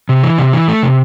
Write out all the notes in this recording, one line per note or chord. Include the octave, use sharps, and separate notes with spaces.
C3
E3
C3
E3
A3
C3